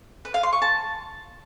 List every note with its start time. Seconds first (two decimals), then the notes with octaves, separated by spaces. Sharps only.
0.25 B4
0.34 F5
0.43 C6
0.53 C#6
0.62 A5